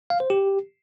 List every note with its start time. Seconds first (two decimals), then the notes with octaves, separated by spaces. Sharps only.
0.10 F5
0.20 C5
0.30 G4